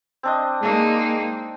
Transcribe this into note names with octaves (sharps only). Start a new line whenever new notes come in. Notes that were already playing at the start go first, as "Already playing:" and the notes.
C4 D4 D#5
G#3 A#3 D#4